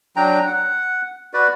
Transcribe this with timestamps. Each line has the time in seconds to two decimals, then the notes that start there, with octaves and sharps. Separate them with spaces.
0.16 F#3 D4 G5 A#5
0.47 F#5
1.33 F#4 B4 D5